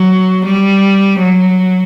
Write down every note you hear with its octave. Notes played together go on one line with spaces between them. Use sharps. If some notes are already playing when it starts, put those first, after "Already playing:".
Already playing: F#3
G3
F#3